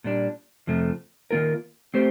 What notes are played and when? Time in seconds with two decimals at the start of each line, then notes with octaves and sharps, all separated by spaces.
0.04 A#2 G3 D4
0.67 F2 C3 F3 A3
1.31 D#3 A#3 F4 A#4
1.94 A3 C4 G4 C5